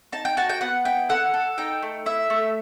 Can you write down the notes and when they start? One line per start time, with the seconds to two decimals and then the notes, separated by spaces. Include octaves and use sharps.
0.12 D#4 A5
0.25 G5
0.37 F#4 A5
0.49 G5
0.61 B3 F#5
0.85 E4 G5
1.09 A4 F#5
1.34 A4
1.58 D#4 G5
1.83 A3
2.06 E4 E5
2.30 A3